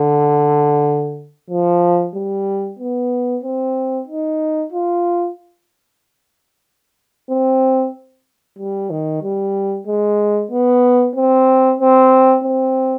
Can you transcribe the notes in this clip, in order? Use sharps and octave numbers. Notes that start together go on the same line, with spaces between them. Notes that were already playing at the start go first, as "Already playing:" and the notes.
Already playing: D3
F3
G3
B3
C4
D#4
F4
C4
G3
D#3
G3
G#3
B3
C4
C4
C4